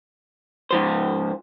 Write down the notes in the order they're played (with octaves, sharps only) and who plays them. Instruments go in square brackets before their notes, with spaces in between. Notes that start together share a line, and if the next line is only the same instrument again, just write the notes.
[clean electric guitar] G#2 F3 C5